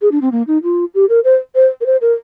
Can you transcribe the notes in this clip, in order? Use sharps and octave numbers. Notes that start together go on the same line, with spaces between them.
G#4
D4
C4
A#3
D#4
F4
G4
A#4
C5
C5
A#4
C5
A#4